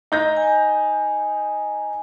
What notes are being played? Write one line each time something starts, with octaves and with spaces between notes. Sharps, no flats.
D#4 G6 A#6
G#5